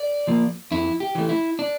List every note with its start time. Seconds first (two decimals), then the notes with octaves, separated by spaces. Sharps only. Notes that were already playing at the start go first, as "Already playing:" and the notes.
Already playing: D5
0.27 F3 A#3
0.71 F2 E4
1.00 G4
1.15 E3 A3
1.29 E4
1.59 D4